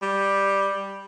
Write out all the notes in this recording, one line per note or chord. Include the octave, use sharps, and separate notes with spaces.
G3